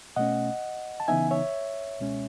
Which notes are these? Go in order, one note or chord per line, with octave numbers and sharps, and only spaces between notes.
B2 A3 C#4 D#5 F#5
A5
C#3 E3 B3 D#4 E5 G#5
C#5 E5
C#2 B2 G#3 C#4